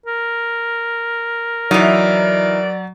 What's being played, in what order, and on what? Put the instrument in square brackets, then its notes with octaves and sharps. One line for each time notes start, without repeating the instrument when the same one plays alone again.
[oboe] A#4
[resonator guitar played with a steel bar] E3 D#4 [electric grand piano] F#3 [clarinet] D5